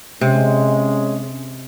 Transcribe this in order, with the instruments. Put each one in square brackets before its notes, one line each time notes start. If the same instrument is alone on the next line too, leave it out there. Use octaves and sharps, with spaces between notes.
[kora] C3 [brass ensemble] G#3 C#4